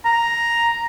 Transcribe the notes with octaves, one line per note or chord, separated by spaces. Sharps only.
A#5